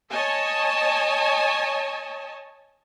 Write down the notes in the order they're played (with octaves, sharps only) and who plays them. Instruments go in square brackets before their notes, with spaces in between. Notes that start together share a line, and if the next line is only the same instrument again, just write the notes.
[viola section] C#5 D#5 G#5 A5